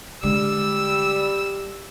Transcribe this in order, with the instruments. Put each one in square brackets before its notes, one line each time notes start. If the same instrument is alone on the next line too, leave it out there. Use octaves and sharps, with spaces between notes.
[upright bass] D3 G#3 [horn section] G3 [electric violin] E6